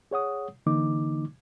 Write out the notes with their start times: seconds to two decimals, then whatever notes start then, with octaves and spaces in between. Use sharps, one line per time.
0.11 G#4 C#5 F#5 D#6
0.66 D3 E3 A#3 D#4 D6